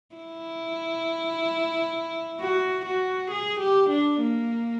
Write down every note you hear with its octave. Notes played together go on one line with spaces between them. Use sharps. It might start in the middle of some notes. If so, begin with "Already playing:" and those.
E4
F#4
F#4
G#4
G4
D4
A#3